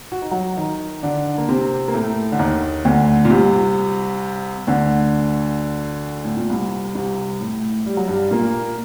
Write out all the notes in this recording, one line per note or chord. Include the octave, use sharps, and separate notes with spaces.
F#4
D#4
F#3 F#4
D#3 D#4
D3 D4
A#3
C3 C4
A#3
A2 A3
D3
D#2 D#3
D2 D3
A#2
C2 C3
D2 D3
A2
A#2
C2 C3
C2 C3
A2
G3
F#3
G2 G3
A#2 A#3